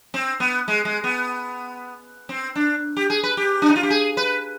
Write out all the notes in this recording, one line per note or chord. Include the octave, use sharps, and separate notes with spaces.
C4
B3
G#3
G#3
B3
C4
D4
G4
G#4
B4
G4
D4
D#4
F4
G4
G#4
B4